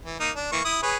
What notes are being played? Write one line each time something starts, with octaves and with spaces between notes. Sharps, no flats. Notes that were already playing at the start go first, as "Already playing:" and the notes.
E3
A#3 D#4
D4
E3 A#3 C#6
E4 D#6
G#4 B4 C#5